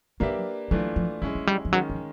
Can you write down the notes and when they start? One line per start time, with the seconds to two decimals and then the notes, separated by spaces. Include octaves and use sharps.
0.20 F#3 A#3 D4 G4 B4 E5
0.71 E3 F#3 A3 D4 F4
0.96 F3
1.22 F#3 G#3 C#4 E4
1.35 F#3
1.47 G3
1.65 F3
1.73 D#3 F#3 G#3 C#4
1.90 F3